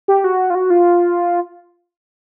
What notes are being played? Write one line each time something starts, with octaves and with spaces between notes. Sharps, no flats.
G4
F#4
F4
F#4
F4